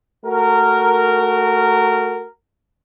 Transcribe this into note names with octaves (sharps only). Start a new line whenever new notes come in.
A3 F#4 A#4